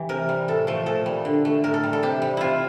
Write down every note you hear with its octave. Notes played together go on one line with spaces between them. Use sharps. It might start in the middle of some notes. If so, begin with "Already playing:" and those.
Already playing: E3 G4
C3 A#4
G3
A2 A4
F3 A3
A#2 A4
G3
D3
A3
A2 A#4
A4
G3
A4
C3 G4
G3
C3 E4 F4